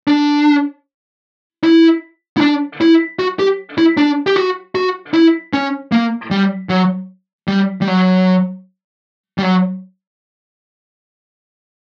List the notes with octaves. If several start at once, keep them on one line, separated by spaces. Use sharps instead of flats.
D4
E4
E4
D4
E4
F#4
G4
E4
D4
G4
F#4
F#4
E4
C#4
A#3
G3
F#3
G3
G3
F#3
G3
F#3